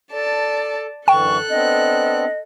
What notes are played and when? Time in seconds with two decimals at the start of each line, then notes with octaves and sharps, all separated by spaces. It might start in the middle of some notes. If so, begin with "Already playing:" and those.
0.12 A4 D5 A5
1.08 F#2 D3 E3 A4 G5 C#6 F#6
1.50 B3 C4 D4 D#5